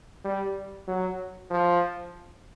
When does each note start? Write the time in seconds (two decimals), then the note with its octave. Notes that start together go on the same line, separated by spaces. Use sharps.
0.25 G3
0.87 F#3
1.50 F3